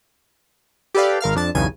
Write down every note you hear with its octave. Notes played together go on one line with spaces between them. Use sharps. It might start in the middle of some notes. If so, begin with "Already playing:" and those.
G4 A4 B4 D5 F5
G#1 A#4 F5 F6
F2 D4 A5
B1 E2 G2 C#3 G#5 D#7